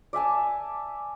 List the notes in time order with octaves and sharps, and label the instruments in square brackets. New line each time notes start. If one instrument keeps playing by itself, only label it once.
[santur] D5 E5 G#5 A5